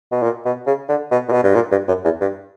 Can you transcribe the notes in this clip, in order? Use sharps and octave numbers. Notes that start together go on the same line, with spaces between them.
B2
A#2
B2
C#3
D3
B2
A#2
B2
G2
A#2
G2
F#2
E2
G2